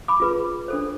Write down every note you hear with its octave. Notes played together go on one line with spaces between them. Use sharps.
B5 D6
F4 G#4 B4
D4 A4 C5